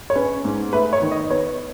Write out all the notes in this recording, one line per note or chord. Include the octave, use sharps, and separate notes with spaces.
C#5
C#4 B4
G#2
A3 B4
C#5
D#3
D#5
B3 C#5